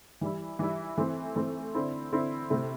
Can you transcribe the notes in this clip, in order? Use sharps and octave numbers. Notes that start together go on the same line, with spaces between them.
E3 G3 E4
E3 G3 E4
E3 A3 C4
E3 A3 C4
D3 C4 E4
D3 C4 E4
C3 A3 C4 E4